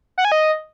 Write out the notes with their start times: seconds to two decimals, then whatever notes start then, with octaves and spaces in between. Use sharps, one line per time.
0.18 F#5
0.25 G#5
0.32 D#5